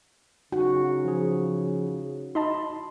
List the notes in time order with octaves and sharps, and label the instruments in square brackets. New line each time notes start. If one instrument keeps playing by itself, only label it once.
[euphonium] C#3 [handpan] D#4 F#4 [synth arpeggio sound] F#5
[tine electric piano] F3 G#4
[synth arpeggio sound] D#4 D#5 A5 [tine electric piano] B5 C6